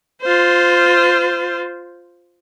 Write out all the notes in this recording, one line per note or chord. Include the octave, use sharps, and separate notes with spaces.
F4 C5